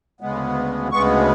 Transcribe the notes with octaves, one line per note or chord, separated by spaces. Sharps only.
D2 C#3 G#3 B3
D2 C#3 G#3 B3 C#6